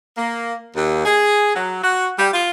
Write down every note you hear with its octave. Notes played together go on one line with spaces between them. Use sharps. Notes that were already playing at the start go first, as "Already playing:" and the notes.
A#3
D#2
G#4
F#3
F#4
G3
F4